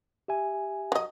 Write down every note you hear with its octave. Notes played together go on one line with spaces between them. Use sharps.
G4 E5 G#5
F#3 D#5